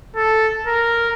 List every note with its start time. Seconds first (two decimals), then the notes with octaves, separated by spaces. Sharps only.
0.16 A4
0.67 A#4